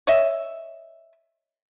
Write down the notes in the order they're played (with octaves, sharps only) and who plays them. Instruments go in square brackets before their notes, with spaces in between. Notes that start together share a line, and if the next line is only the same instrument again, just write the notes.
[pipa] C#5 D#5 E5